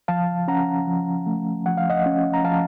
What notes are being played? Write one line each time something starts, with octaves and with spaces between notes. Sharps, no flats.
F3 F5 A5
C#4 F#5 A#5
F3
A3
F3 F#5
F5
D#5 F#5
C#4
A#5
F3 F5 A5